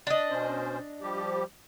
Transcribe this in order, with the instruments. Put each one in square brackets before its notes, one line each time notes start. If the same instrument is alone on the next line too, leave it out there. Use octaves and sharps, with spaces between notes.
[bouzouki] D4 D#5
[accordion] B2 C#4 C5
F3 G3 G4